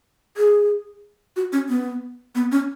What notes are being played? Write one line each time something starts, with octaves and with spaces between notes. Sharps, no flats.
G#4
F#4
C#4
B3
B3
C#4